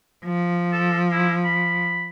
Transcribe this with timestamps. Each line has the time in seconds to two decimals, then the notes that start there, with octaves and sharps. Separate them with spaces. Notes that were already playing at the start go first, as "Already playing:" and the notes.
0.24 F3
0.73 A4
1.12 E4
1.44 B5